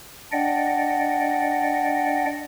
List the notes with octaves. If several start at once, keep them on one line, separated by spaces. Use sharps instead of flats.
D4 D5 D#5 F#5 G5